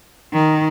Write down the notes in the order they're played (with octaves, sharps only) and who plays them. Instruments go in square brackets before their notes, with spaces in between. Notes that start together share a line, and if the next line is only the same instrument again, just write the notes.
[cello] D#3